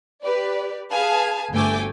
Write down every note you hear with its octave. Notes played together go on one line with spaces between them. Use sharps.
G4 B4 D5
G#4 B4 F5 G#5 A5
G1 D2 A3 G5 G#5 D6